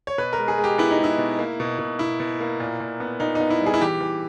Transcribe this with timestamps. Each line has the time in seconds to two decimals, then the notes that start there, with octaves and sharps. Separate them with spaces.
0.07 C#5
0.18 B2 B4
0.33 A#4
0.38 G#3
0.48 G#4
0.58 G#3
0.64 G4
0.78 B3 E4
0.91 D#4
0.99 G#3
1.04 E4
1.18 B2
1.39 A#3
1.60 B2
1.79 B2
1.99 B2 E4
2.20 B2
2.40 A#3
2.60 A#2
2.80 A#2
3.00 B3
3.20 A#2 D#4
3.35 B3 D#4
3.50 E4
3.61 G3
3.66 G#4
3.74 E4
3.81 E3 G4
4.01 E3